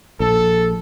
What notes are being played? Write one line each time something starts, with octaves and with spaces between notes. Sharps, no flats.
A#1 A4